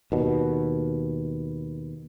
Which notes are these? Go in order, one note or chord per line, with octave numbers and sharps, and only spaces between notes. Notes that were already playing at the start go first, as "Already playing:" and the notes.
D#2 B2